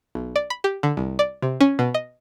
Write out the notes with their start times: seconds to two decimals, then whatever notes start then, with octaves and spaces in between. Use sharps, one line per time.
0.15 B1
0.36 D5
0.50 B5
0.64 G4
0.83 D3
0.97 C2
1.19 D5
1.42 C3
1.61 C#4
1.79 B2
1.94 D#5